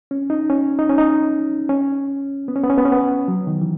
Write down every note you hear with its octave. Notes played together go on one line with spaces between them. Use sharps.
C#4
D#4
C#4
D#4
C#4
D#4
C#4
B3
C#4
B3
C#4
B3
C#4
B3
F#3
D#3
E3